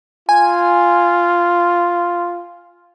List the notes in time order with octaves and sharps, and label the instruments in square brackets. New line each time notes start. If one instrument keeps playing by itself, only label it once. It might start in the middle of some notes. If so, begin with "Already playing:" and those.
[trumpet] F4 [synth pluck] G#5